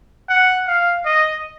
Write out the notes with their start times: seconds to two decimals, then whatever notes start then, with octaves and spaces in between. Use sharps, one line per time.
0.29 F#5
0.68 F5
1.05 D#5